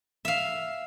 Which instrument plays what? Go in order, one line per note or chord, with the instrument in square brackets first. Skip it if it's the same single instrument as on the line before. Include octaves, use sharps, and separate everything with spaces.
[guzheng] E5 F5